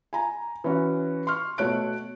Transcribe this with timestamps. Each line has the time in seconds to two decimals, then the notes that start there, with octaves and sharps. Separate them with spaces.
0.13 G#5 A#5
0.64 E3 C#4 F#4
1.27 C6 C#6 F6
1.58 B2 A3 C#5 F#6 D7